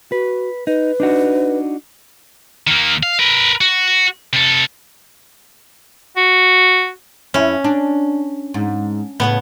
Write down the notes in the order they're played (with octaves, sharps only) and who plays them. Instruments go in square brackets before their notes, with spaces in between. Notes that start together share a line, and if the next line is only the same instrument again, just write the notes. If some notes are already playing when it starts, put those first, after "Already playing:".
[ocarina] F#4 [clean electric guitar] B4
[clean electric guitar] D#4 [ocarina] B4
[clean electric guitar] D4 D#4 F#4
[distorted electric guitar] D#3 A#3
F5
A#4 B4
F#4
C3 A4
[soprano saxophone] F#4
[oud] F2 E4 [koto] C#4
[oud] D4
G#2
[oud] A2 C#3 B4 [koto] B3